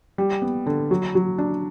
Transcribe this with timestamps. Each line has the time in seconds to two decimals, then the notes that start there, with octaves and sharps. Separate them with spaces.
0.18 G3
0.42 B3
0.66 D3
0.91 F#3
1.15 F#3
1.38 D4